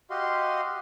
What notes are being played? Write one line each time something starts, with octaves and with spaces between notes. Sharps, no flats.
F#4 G4 D#5 F5 C6